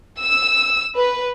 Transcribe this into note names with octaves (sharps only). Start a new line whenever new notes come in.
E6
B4